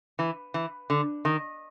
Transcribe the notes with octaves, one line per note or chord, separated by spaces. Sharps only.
E3
E3
D3
D#3